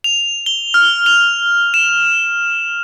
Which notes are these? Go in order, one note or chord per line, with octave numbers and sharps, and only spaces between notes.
F7
G7
F6
F7
E7